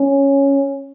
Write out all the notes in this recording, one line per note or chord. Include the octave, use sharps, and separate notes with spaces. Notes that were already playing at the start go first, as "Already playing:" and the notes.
Already playing: C#4